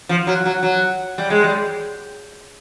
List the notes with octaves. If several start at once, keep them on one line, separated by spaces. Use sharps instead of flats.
F3
F#3
F#3
F#3
G3
G#3
G3